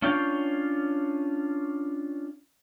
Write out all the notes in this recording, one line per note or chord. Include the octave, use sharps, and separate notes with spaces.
C#4 D4 F4 C#5 G5